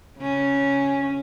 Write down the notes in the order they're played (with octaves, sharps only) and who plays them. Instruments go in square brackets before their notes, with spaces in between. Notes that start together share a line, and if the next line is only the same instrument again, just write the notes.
[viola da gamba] C#3 C#4